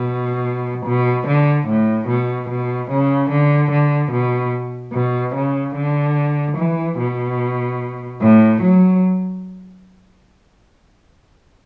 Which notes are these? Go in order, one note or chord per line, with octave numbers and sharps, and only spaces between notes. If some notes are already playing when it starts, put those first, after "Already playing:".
Already playing: B2
B2
D3
A2
B2
B2
C#3
D3
D3
B2
B2
C#3
D3
E3
B2
A2
F#3